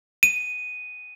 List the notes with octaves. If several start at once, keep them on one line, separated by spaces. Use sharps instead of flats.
D#7